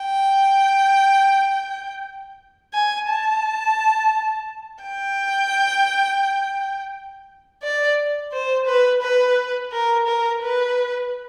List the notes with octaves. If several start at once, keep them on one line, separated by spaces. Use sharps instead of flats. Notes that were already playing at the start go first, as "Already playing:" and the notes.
Already playing: G5
G#5
A5
G5
D5
C5
B4
B4
A#4
A#4
B4